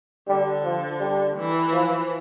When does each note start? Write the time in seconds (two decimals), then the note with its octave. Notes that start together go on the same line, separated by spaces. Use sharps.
0.28 D3 G3
0.64 F3
1.00 G3
1.37 E3
1.72 F3